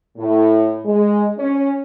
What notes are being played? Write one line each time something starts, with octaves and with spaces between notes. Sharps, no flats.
A2
G#3
C#4